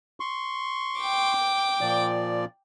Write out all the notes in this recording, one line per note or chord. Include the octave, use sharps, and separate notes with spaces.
C6 C#6
G5 D6
A#2 F3 D5